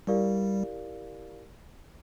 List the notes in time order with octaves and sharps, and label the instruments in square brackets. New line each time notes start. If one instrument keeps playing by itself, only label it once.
[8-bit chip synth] G3 [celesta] E4 G4 A#4 D5 F5